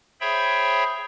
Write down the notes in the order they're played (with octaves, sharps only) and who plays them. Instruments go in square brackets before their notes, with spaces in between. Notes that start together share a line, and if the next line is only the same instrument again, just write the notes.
[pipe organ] G#4 C5 C#5 E5 G5 B5